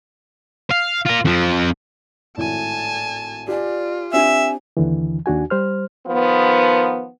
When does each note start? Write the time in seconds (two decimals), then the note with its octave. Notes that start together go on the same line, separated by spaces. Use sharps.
0.71 F5
1.05 F4 A#4
1.25 F2 F3
2.37 G#1 A2 G#5 A5
3.48 F4 G4 D5 G#5
4.13 C4 D4 G4 E5 G#5
4.77 D#2 D3 E3
5.26 D#2 D4 F#4 G#5
5.50 G3 C5 F6
6.07 D#3 F3 B3